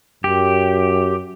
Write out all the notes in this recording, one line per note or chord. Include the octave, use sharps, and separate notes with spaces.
F#2 G4